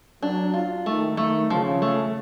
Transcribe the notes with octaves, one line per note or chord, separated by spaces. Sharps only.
F#3 D4
F4
D#3 A3
A3
C#3 F3
A3